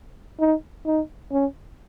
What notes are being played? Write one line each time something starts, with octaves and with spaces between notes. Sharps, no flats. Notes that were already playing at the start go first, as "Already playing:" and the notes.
D#4
D#4
C#4